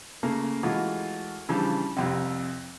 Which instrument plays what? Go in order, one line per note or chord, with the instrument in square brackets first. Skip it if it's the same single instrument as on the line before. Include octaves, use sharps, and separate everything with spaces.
[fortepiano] C#3 A3 A#3
E3 G#3 A3 F4 F#4
C#3 E3 F3 G3 D4
C2 F2 C3